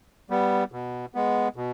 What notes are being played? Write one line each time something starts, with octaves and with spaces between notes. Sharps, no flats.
G3 B3
B2
G#3 B3
B2